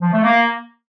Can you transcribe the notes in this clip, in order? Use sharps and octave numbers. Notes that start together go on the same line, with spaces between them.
F3
A3
A#3